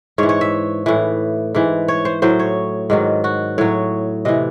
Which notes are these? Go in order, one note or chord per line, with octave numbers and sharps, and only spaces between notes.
G#2 E3 C#5
C#5
E5
A2 E3
G#2 E3
C#5
C5
A2 F#3 C5
C#5
G#2 D#3 F#3
F#4
A2 F#3 C#5
C3 E3 D#5